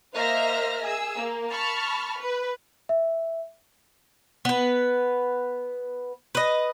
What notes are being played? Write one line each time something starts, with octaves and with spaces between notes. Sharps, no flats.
A#3 C5 D#5 E5 F6 A#6
G#4 E6
A#3
A5 B5 C#6 F6
B4
E5
B3 B4
B4 D#5